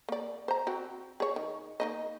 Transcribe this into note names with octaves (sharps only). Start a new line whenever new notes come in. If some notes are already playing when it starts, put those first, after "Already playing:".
A#3 D5
C5 A#5
C4 F#4
G#4 C#5
D#3
A#3 D#4 D#5